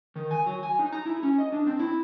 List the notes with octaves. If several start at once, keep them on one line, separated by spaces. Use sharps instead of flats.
D#3
G#5
F#3
G#5
D#4
A#5
E4
C#4
D#5
D4
C4
E4